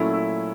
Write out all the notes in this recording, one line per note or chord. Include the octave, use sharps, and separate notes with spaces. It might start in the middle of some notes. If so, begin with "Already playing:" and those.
Already playing: A#2 F#3 A3 C#4 E4
E4